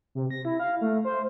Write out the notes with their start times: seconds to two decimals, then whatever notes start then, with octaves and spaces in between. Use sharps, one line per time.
0.15 C3
0.30 A#6
0.45 E4
0.60 F5
0.81 A3
1.05 C5